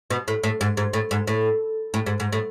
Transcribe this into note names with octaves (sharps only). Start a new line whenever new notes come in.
B2
A2
A2
G#2
G#2
A2
G#2
A2
A2
G#2
G#2
A2